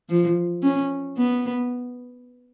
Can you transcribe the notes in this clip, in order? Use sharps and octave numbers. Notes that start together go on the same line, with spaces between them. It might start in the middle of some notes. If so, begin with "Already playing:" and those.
F3
C#4
B3